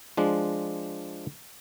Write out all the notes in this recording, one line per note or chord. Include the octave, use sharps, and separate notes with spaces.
F3 G#3 D4